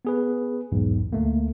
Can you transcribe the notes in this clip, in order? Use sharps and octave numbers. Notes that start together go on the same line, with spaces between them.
B3 G#4 B4
B1 E2 G#2
D2 A3 A#3